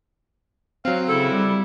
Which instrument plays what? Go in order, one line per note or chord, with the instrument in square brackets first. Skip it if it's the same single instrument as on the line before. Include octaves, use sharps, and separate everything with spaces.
[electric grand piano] F#3 C4 [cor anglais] F5
[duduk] C#3 [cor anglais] E4 [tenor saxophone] A4
[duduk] G3